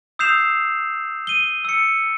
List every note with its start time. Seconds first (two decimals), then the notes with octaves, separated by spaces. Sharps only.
0.19 D#6 E6 G6 C7 E7 F7
1.27 D#7 G7
1.65 E6 C#7